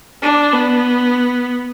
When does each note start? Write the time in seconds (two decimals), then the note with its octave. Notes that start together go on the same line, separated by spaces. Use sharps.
0.22 D4
0.53 B3